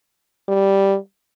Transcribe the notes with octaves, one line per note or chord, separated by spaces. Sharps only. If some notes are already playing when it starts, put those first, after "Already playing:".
G3